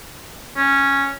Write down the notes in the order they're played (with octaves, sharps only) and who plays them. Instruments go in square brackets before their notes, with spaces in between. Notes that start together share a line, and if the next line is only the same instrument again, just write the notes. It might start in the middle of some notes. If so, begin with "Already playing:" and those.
[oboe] C#4